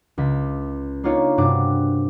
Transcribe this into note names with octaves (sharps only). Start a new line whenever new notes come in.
C#2 B6
A#3 D4 D#4 F4 C#5
G2 C3 D4 F#4 D6